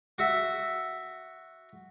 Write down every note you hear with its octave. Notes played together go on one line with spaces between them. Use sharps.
F#4 E5